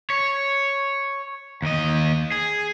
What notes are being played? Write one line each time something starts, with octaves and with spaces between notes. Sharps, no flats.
C#5
D#2 D#5
G#4